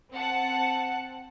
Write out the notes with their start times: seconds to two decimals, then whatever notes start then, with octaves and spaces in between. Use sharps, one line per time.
0.12 C4 F#5 A5